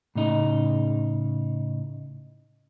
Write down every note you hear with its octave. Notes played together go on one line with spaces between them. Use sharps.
A2 C#3 D#4